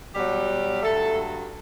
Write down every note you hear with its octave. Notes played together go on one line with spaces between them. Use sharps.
B2 F#3 G3 G4
G2 D3 F#3 A3 A4